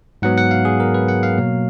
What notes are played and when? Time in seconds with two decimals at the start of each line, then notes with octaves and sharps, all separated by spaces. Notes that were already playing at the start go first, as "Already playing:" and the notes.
0.22 G#2 F#3 B3 F#5
0.38 F#5
0.51 F5
0.65 G#4
0.80 A#4
0.94 B4
1.08 F#5
1.23 F5
1.38 B2 F#3 A#3